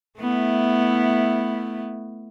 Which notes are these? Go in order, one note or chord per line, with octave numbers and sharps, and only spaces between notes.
A3 B3 E4